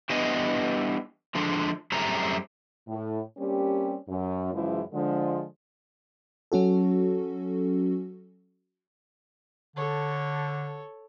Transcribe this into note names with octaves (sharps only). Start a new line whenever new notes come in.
E3 G3 B3 D4 D#5 G#5
D3 F3 G#3 D4
F#2 G3 A3 C4 G#4 A#5
A2
G3 A#3 C4 C#4 G4
F#2
F#2 C#3 E3 F3 G#3 E4
D3 F3 G#3
F#3 C#4 F#4 A4
D3 A4 C#5